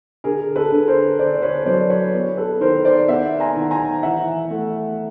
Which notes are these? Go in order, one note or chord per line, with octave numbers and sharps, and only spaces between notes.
D3 G#4 A#4
A4 B4
D3
A#4 C5
D3 C5 D5
C5
B4 C#5
F#3 C5 D5
B4 C#5
B3
A4 B4
D#3 A#4 C5
C5 D5
B3 E5 F#5
G#5 A#5
D#3
G#5 A#5
E3 E5 F#5
A3